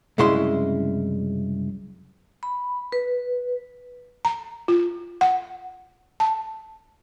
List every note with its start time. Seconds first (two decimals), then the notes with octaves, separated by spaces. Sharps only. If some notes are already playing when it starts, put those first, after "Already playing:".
0.18 C2 F#2 C#3 G#3 E4 C6
2.43 B5
2.92 B4
4.25 A#5
4.68 F4
5.21 F#5
6.20 A5